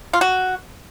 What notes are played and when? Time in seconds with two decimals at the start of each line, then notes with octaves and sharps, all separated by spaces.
0.13 F4
0.21 F#4